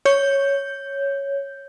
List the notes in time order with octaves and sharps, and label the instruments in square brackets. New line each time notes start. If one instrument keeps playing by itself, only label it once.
[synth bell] C#5 G6